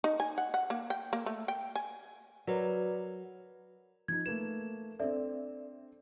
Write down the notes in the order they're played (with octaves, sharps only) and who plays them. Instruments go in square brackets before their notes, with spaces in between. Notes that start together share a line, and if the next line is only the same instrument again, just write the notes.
[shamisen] D#4
G#5
F#5
F#5
A#3
G5
A#3
A3
G5
G#5
[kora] F#3 [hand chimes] A#4 B4 D5
[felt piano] F3 D#4 [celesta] G#6
[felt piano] A3 A#3 B4 [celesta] E7
[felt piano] C4 D4 [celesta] A4 D5 E5